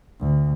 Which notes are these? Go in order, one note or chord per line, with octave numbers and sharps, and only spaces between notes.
D2